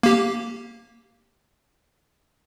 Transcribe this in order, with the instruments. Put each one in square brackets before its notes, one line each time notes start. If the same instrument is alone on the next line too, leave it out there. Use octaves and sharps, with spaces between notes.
[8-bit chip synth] A#3 G4